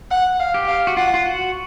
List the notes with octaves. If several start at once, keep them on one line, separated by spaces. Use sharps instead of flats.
F#5
F5
G4
F5
F#4
F4 F#5
F4
F#4